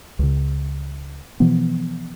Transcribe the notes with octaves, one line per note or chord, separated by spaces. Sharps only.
C#2 C#3
B2 E3 F3 B3